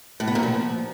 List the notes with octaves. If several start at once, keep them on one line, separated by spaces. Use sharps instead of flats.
A2
B3
A#2
F3